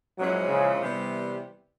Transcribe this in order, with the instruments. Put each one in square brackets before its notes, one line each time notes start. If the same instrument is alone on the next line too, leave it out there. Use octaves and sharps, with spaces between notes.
[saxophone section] A#2 F3 G#3 C#4 E4 [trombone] F#3
[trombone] C#3
[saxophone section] C3 E3 G3 B3